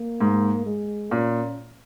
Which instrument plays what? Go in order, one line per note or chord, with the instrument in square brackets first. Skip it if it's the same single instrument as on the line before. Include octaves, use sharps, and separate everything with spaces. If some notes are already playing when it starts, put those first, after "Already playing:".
Already playing: [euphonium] A#3
[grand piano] G#2
[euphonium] G#3
[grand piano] A#2 [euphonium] C#4